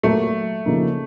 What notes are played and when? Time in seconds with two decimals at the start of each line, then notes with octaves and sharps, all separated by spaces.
0.03 A#2 F#3 A3 A#3
0.66 C#3 F3 A#3 D#4